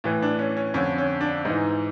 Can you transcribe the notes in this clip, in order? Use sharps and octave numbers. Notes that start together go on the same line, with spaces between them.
A2 E3
D4
C#4
C#4
F2 D3 C#4
C#4
D4
G#2 E3 D#4